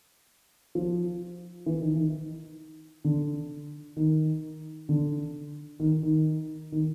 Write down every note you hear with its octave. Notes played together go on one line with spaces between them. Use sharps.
F3
E3
D#3
D#3
D3
D#3
D3
D#3
D#3
D#3